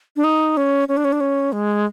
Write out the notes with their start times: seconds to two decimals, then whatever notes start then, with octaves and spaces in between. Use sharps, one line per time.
0.16 D4
0.24 D#4
0.57 C#4
0.88 C#4
0.97 D4
1.05 C#4
1.12 D4
1.21 C#4
1.52 G#3